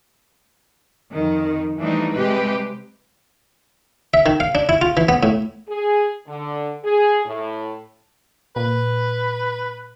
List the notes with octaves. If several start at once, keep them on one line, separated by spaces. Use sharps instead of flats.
F2 D#3
E3 F3 G3 A3 D4 D#4
C3 G3 G#3 C4 G4 B4
E5
D#3
F5
D4
E4
F4
E3
B3
A2
G#4
D3
G#4
A2
A#2 B4